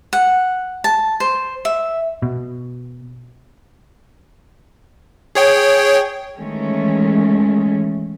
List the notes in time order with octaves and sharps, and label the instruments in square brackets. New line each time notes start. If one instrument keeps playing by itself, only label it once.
[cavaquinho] F#5
A5
C5
E5
[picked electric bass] B2
[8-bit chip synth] G#4 C#5 G5
[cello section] D#3 E3 G#3 A3 C#4